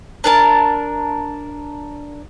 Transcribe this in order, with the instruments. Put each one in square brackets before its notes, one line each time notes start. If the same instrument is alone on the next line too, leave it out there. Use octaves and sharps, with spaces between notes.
[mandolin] D4 A#4 A5